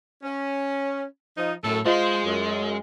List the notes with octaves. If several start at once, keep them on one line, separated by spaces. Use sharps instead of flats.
C#4
F3 D#4
F#2 A2 A4
G#3 F4 C5 D#5
F#2